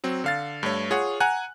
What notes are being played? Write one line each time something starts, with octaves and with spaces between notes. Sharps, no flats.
F#3 C4
D3 F5 A6
G2 A3 C#5
F4 G#4 C#5 F#5
F#5 G#5 A#5 F#6